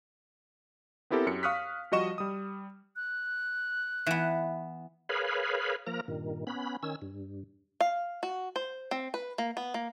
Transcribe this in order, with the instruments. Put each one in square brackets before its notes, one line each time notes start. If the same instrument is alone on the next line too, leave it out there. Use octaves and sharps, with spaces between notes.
[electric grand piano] B3 C4 E4 G4 A4 A#4
F#2 G4 C#7
F5 C#6 D#6 F6 F#6 B6
F3 G3 F#4 D#5 C#6 E7
G3 D#6
[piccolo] F#6
[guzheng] E3 B3
[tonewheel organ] G#4 A#4 B4 C#5 F5 B5
F3 A#3 A#4 A#5
G2 A#2 D#3
B3 C#4 B5
D#3 C#4 E6
G2
[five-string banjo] F5
F#4
C5
C4
B4
A#3
B3
A#3